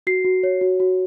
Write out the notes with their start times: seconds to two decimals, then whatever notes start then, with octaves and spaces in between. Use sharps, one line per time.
0.07 F#4 C7
0.25 F#4
0.43 C#5
0.61 F#4
0.80 F#4